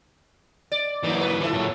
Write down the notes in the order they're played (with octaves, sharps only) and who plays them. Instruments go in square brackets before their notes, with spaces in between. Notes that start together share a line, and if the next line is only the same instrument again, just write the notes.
[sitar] D5
[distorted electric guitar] E3 F#3 [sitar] A3 A#3 D#4
[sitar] A#3 B4
[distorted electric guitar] E3 F3 [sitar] E4 A4
[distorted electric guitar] A#2 F#3